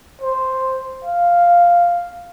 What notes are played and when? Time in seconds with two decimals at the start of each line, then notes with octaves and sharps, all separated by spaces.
0.21 C5
1.04 F5